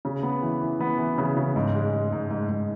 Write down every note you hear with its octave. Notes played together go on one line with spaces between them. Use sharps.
C#3
B3
E3
E3
B3
E3
C#3
C#3
G#2
G#3
G#3
G#2
G#2
G#2